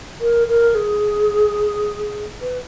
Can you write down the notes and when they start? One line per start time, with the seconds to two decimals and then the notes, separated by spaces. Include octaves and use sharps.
0.20 A#4
0.48 A#4
0.74 G#4
2.41 B4